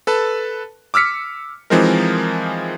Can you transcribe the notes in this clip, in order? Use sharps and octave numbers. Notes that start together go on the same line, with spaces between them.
A4 B4 A5
D6 E6 F6 B6 C#7
E3 F3 G#3 C4 D#4 A#4